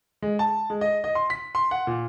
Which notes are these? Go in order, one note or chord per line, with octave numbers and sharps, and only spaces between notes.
G#3
A5
G#3
D#5
D#5
C6
B6
C6
F#5
A#2